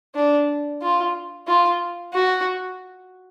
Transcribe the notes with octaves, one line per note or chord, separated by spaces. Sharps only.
D4
F4
F4
F#4